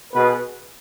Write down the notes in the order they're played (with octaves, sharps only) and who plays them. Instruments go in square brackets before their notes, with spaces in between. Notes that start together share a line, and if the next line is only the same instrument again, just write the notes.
[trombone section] B2 B3 G#4 B4